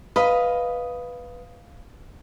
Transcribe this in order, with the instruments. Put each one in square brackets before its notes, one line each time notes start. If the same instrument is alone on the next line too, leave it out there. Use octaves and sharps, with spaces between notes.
[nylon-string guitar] B4 [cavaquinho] D#5 F5 B5